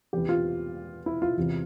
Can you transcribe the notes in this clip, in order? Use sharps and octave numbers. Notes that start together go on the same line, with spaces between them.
E2 C3 E3 G4
F4
E4
F4
E2 C3 E3